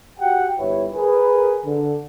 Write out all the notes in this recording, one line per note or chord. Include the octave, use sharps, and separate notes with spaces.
F#4 G4 F#5 G5
G1 E4 G4 B4 C#5
G#4 A#4 B4
D3